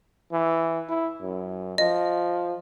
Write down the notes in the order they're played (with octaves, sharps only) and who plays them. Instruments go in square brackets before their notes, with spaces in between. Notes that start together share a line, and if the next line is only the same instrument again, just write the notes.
[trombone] E3
E4
F#2
[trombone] F3 [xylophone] D#5